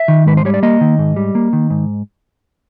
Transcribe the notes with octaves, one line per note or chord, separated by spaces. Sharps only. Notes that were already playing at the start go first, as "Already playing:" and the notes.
Already playing: E5
D#3
G#2 B4
C5
G3 C#5
D5
A#3 D#5
D#3
G#2
G3
A#3
D#3
G#2